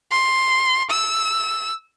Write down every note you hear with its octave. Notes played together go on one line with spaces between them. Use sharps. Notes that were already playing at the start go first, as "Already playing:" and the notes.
C6
E6